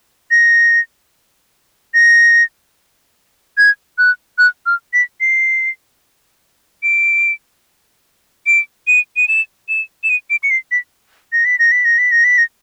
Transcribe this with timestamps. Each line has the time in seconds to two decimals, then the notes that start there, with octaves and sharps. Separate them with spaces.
0.31 A#6
1.94 A#6
3.58 G#6
3.98 F#6
4.38 F#6
4.66 F6
4.93 B6
5.21 C7
6.83 D7
8.47 D7
8.87 D#7
9.17 D#7
9.28 E7
9.69 E7
10.04 E7
10.10 D#7
10.30 D7
10.43 C#7
10.50 C7
10.71 B6
11.33 A#6
11.45 B6
11.59 A#6
11.72 B6
11.85 A#6
11.98 B6
12.12 A#6
12.24 B6
12.38 A#6